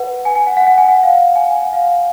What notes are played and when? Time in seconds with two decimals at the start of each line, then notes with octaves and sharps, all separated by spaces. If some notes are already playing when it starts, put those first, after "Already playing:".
Already playing: B4 F#5
0.25 G#5
0.35 G#5
0.47 F#5
0.57 F#5
0.67 F#5
0.78 G#5
0.88 F#5
1.03 F5
1.36 G#5
1.51 G#5
1.62 F#5
1.73 F5